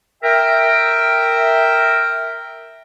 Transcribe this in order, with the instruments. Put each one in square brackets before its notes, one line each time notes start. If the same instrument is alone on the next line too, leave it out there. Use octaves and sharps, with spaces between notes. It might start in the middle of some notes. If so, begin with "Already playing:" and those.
[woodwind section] A#4 E5 G5